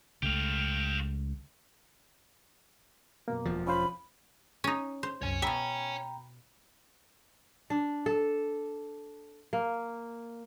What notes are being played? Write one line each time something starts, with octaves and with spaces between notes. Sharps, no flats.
C#2 A3 G4 F5
F#2 B2 A#3
E1 F3
C#4 F4 C5 B5
C#4 D#4
C5
C2 F#2 C#5 G#5
B2 E5 G5 A#5 B5
D4
A4
A#3